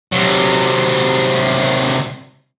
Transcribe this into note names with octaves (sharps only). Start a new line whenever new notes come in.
C3 F#3